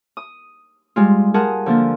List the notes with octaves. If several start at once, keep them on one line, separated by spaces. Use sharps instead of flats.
D#6
G3 G#3 F4
F4 G#4 A#4 F#5 A5 D#6
D3 F3 A#3 D4